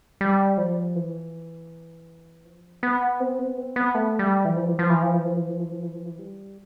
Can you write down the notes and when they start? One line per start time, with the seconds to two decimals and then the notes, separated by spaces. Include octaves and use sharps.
0.21 G3
0.58 F3
0.95 E3
2.45 F3
2.83 B3
3.20 C4
3.39 B3
3.58 C4
3.76 B3
3.95 A3
4.19 G3
4.45 E3
4.56 F3
4.68 E3
4.79 F3
4.90 E3
5.02 F3
5.13 E3
5.25 F3
5.36 E3
5.48 F3
5.59 E3
5.71 F3
5.83 E3
5.94 F3
6.05 E3
6.19 G3